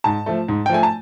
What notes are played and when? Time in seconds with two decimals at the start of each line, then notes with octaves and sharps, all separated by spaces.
0.04 G#2 A5
0.26 F3 A3
0.48 G#2
0.66 G5
0.70 F3 A3 G#5
0.83 A5